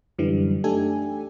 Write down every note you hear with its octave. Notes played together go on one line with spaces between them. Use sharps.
F#2 D3 E3 G3
A3 D4 D#4 G4 A4 G#5